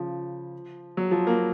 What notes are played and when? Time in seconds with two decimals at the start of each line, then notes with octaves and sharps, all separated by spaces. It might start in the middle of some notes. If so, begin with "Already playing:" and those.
Already playing: C#3 F3
0.97 F#3
1.11 F3
1.27 A#3